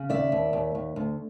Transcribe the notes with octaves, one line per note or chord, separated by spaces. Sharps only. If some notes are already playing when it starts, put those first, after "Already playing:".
Already playing: C#3
D#2 D5 E5
D#2
D#2
D#2
D2